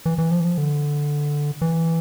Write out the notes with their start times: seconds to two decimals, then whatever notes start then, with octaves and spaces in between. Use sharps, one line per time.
0.06 E3
0.18 E3
0.31 F3
0.40 E3
0.44 F3
0.58 D3
1.62 E3